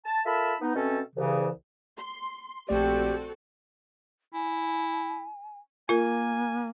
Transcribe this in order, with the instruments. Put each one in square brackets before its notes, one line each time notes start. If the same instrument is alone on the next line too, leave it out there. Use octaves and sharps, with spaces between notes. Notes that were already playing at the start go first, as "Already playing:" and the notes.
[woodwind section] A5
F4 A4 A#4 E5 A5 B5
B3 D#4
B2 A3 C4 C#4 A4
C2 C#3 E3
[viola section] C6
[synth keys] A#1 A3 D5 [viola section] C4 F#4 A4 [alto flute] G4
[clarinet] E4 [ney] G#5
[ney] A#3 [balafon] F4 A#4 [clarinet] G#5